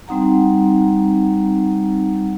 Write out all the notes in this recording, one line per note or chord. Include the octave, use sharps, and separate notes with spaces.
G3 C4 D#4 F#5 A#5